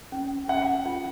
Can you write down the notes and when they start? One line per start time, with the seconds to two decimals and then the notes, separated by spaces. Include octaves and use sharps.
0.12 C#4
0.48 C#4 F#5
0.86 F4